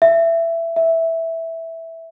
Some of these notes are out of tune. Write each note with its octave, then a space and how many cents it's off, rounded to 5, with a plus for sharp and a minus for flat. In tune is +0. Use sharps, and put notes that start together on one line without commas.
E5 +15
E5 -5